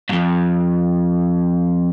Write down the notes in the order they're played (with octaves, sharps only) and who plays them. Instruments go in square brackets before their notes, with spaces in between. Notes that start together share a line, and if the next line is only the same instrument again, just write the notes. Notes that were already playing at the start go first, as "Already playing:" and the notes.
[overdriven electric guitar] F2 G#2